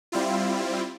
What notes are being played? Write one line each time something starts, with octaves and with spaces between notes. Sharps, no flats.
G3 C4 E4 F4